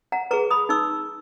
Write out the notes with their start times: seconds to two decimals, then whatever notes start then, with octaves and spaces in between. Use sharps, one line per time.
0.12 F#5 A#5
0.31 G#4 B4 A#5 C#6
0.51 B5 D#6
0.69 D#4 C#6 E6